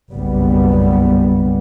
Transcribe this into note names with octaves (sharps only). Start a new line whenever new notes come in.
F#1 B1 G2 G3 B3